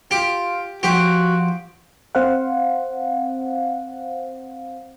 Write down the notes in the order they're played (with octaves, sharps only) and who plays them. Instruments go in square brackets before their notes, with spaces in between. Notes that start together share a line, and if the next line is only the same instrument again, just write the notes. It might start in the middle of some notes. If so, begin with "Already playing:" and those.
[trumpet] F4 [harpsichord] G4
[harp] F3 [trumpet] F#4 [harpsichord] G4
[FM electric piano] C4 C5 F5 F#5